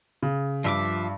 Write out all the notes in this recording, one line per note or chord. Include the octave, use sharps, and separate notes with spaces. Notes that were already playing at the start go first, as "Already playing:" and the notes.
C#3
G2 F3 E5 D6